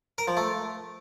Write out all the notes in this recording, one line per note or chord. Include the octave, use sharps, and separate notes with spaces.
A#4
F3
A3